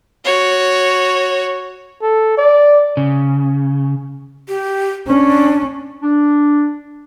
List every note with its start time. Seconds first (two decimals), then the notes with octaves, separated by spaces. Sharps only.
0.25 F#4 C#5
2.02 A4
2.38 D5
2.97 C#3
4.48 G4
5.07 C#4 D4
6.03 D4